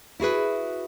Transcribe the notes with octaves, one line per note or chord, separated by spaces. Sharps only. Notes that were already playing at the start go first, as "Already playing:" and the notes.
E4 F#4 G#4 B4